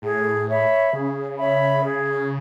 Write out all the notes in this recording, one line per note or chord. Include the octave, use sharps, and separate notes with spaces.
A2 G#4
C#5 E5 B5
C#3 G#4
C#5 E5 B5
G#4